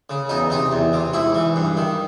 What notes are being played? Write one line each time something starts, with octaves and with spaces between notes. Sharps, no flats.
C#3
E2 D#4
C3 D#4
E2
C3
G#2 E4
E3
G2
D#3